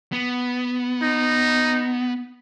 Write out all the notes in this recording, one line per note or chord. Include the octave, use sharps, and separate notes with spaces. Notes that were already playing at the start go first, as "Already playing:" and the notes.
B3
D#4